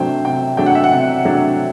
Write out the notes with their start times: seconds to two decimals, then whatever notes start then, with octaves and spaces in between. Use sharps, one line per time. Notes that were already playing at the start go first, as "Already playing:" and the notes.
Already playing: C3 F#3 A3 D4 C5 G5
0.25 C3 G5
0.57 F#3 A3 D4 G5
0.66 F#5
0.75 E5
0.84 F#5
0.92 C3
1.25 F#3 A3 D4